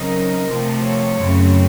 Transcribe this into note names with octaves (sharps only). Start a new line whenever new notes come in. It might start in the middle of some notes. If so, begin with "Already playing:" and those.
Already playing: C#3 F#3 C4 D#4 A#4
C3 F3 A3 C4
C#5
F#2 C#3 A3 C4